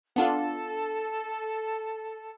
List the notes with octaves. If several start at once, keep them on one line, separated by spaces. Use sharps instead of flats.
B3 D4 F4 A4